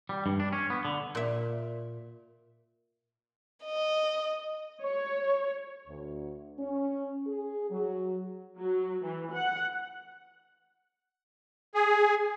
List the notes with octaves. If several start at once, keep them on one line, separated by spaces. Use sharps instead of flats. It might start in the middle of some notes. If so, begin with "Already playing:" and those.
G3
G2
D4
C#4
B3
D3
A#2 E5
D#5
C#5
D2
C#4
G#4
F#3
F#3
E3
F#5
G#4